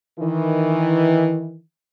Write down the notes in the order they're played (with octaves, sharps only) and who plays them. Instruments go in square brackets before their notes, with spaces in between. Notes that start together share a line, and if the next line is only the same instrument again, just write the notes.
[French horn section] D#3 E3